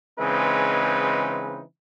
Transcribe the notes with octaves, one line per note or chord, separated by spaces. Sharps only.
C#3 E3 G#3 C4 D#4 B4